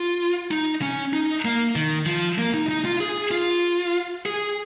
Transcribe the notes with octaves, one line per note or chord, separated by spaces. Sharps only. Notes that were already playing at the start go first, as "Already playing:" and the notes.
Already playing: F4
D#4
C#4
D#4
A#3
D#3
F3
A#3
D#4
D#4
F4
G#4
F4
G#4